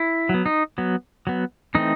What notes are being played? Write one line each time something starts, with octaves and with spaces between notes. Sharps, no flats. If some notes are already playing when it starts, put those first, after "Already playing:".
Already playing: E4
F#3 B3
D#4
F#3 B3
F#3 B3
E3 A3 C4 D#4